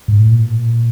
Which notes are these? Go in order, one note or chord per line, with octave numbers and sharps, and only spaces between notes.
G#2
A2
A#2